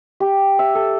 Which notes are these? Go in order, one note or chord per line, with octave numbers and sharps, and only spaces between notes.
G4
E5
A4